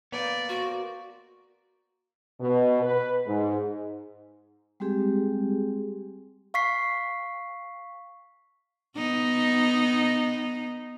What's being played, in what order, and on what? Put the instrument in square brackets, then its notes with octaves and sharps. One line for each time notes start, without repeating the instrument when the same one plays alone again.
[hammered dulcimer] A#3 D#4 [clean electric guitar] B3 [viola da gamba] D5
[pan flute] F#4 [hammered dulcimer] C5
[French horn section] B2
B4
G#2
[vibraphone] G3 G#3 C4 G4 G#4
[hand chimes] F5 C#6 B6 C7
[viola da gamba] B3 D#4